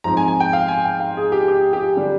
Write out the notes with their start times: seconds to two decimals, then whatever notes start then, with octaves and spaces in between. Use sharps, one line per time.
0.04 G#2 F3 C4 A#5
0.17 G#5
0.28 G#5
0.40 G5
0.53 F5
0.68 G#5
0.85 G5
1.00 F5
1.17 G#4
1.32 G4
1.48 G4
1.73 G4
1.96 D3 G3 D4